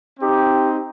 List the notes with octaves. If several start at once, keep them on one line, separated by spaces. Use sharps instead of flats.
C4 D#4 G4